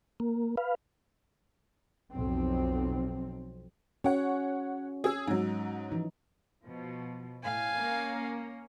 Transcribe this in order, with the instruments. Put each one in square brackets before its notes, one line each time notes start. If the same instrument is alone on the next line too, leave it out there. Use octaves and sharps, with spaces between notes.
[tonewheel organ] A#3
B4 F5
[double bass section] B1 F2 C4
[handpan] C#4 F#4 [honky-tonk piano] C#5 F#5
[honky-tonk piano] G#4 E6
[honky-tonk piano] G#2 F#3 [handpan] D#4
[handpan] E3 F3 D#4
[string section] B2 F3
[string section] A2 [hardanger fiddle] F5 G#5
[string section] A#3 C#4